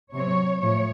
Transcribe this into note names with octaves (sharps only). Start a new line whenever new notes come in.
C3 F#3 C4 C#5
A2 F3 A3 C#5